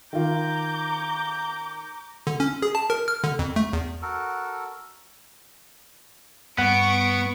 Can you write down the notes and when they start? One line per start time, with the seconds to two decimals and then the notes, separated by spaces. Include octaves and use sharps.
0.13 D#3 F4 A#5 D6 G6
2.27 D3
2.40 C#4
2.62 G#4
2.75 A5
2.90 A#4
3.08 F6
3.24 D3
3.39 F2
3.56 A3
3.73 E2
4.02 F#4 A4 A#4
6.58 G2 B3 F#5 C#6 D7